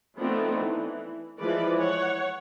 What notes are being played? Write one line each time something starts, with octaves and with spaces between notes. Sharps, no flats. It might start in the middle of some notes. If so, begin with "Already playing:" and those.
F3 A3 B3 C4 D4 D#4
E3
E3 F3 G#3 B4 D5
C#5 F#5